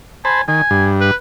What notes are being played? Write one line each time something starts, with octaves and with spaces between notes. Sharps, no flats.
C5 G#5 A5 B5
D#3 G#5
G2
B4